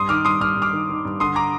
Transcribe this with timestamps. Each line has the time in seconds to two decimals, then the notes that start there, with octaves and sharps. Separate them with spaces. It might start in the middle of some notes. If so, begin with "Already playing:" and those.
Already playing: G2 C6 D#6
0.09 D#3 D6 F6
0.25 G2 C6 D#6
0.41 G2 F6
0.56 G2
0.62 D6 F6
0.73 D#3
0.89 D#3
1.05 G2
1.20 D3 C6 D#6
1.36 A#5 D6